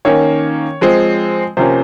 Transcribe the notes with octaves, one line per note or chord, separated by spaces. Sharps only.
D#3 A#3 C#4 C#5
F3 G#3 C4
C3 F3 A#3 C#4 C5